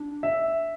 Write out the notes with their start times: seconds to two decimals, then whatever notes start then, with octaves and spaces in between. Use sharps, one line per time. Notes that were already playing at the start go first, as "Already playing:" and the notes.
Already playing: D4
0.23 E5